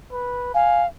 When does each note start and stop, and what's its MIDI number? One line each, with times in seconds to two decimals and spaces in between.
0.12 0.52 71
0.54 0.86 77
0.54 0.82 80